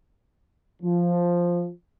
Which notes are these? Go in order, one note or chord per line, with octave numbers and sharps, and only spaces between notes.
F3